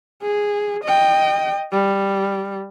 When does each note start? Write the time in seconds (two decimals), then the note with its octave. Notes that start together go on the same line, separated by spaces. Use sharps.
0.22 G#4
0.84 D#5 G5
1.72 G3